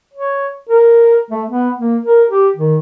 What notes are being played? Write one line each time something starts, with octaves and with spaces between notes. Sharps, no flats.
C#5
A#4
A3
B3
A#3
A#4
G4
D#3